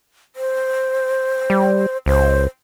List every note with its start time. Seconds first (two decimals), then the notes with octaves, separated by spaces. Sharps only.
0.36 C5
1.50 G3
2.06 C#2 C5